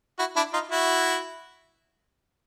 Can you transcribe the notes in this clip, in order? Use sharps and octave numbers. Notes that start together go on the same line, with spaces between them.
E4 F#4
D4 E4
D#4 F4
E4 F#4